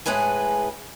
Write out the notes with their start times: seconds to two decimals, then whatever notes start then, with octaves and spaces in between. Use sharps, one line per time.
0.06 A2 G#3 G#4 B4 G#5